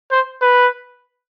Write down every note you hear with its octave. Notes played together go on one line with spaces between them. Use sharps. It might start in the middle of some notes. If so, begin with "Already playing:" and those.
C5
B4